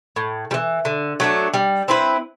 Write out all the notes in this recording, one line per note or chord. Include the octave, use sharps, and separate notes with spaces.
A2
G3
E3
D3
F#3 A3 D4
G3
C4 E4 B4